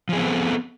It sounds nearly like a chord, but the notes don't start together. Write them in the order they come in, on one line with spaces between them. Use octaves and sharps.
F3 G#4 C4 B3 A4